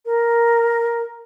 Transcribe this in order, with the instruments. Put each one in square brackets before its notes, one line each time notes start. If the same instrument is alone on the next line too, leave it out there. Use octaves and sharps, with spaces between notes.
[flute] A#4